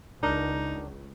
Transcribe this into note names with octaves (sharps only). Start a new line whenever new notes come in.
C#2 D4 D#4 A#4 A#5